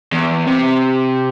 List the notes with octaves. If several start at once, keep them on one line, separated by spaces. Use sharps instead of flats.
E2
C3